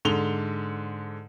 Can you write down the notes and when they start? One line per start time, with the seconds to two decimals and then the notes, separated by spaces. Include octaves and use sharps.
0.05 G#2 D3 F7 G7